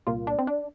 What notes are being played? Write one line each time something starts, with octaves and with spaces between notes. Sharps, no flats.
C2 A#2 A#3 F4
D4
C4
D4